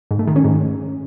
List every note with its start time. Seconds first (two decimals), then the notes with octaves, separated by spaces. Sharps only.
0.11 G#2
0.19 A3
0.27 D#3
0.36 C#4
0.44 G#2